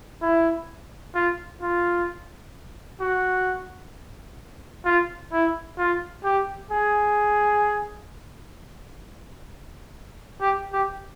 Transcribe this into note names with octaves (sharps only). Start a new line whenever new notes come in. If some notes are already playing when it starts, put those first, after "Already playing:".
E4
F4
F4
F#4
F4
E4
F4
G4
G#4
G4
G4